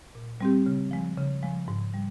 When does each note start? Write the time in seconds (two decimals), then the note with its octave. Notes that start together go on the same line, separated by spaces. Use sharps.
0.15 A#2
0.41 G3 C4 G4
0.66 C#3
0.91 F3 G#3
1.17 C#3
1.43 F3 G#3
1.68 G#2
1.94 G3